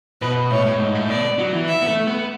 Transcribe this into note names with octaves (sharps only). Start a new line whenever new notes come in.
B2 B4
A2 C#5
A2
G#2
A2
B2 D5
F#3
E3
E5
B3
A3
B3